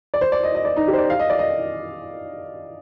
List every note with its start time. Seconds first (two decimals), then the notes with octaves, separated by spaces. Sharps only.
0.14 D5
0.21 C5
0.32 D5
0.43 D#5
0.55 D#5
0.65 D5
0.76 D#4
0.88 G4
0.93 C5
0.98 D5
1.10 F5
1.19 D#5
1.30 D5
1.39 D#5